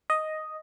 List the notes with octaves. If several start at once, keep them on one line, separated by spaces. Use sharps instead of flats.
D#5